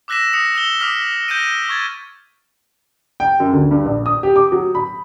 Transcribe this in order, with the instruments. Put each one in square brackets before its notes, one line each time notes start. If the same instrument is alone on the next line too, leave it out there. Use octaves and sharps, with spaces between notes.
[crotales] D6 E6 F#6 A#6 B6 E7
D#6 A#6 C#7
E6 E7 G7
D6 D#6 F6 B6
G6 A#6 D7 D#7
C#6 G#6 A6
[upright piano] G5
F#2
D2
G2
A#1
D#6
G4
D6
F#3
B5